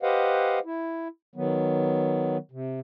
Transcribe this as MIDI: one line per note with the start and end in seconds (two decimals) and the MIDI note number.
0.03 0.59 67
0.03 0.59 71
0.03 0.59 72
0.03 0.59 75
0.03 0.59 77
0.03 0.59 78
0.65 1.08 64
1.36 2.38 51
1.36 2.38 54
1.36 2.38 59
2.52 2.80 48